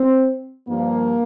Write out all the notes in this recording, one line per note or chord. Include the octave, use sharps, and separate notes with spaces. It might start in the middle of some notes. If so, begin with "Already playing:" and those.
Already playing: C4
G2 F3 A#3